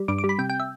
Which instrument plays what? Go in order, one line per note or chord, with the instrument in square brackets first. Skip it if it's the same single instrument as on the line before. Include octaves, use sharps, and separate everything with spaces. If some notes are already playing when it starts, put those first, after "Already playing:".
Already playing: [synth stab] G3
G2 D6
D6
G3
B5
C3 G5
G5
E5